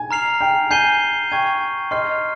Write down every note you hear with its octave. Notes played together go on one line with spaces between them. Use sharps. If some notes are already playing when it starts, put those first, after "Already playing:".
Already playing: G#5
A#5 F6 C7 F7
G5
G#5 G6 C7 D#7 G7
G5 C#6 G#6 D#7
D#5 C6 F6 C7